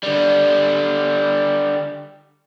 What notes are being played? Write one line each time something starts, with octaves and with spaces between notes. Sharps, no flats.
D3 G3